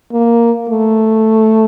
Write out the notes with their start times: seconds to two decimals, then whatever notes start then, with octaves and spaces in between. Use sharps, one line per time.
0.13 A#3
0.69 A3